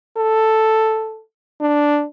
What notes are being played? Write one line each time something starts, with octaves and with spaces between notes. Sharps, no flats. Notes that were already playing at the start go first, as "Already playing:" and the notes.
A4
D4